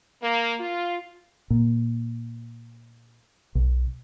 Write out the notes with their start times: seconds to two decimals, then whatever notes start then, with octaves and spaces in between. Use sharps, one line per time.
0.23 A#3
0.60 F4
1.50 A#2
3.55 B1